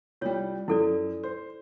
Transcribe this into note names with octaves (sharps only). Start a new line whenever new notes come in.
C2 G3 F4 C#5
F#2 E4 A4 D5
C5